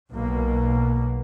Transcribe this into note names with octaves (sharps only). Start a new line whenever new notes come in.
B1 B2 A#3